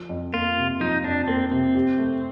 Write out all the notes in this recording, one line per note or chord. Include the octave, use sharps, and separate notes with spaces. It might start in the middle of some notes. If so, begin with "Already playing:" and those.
Already playing: F3
F2
A#3 F4
C3
F3 D#4
F2 D4
A#3 C4
C3 C4
G4
A3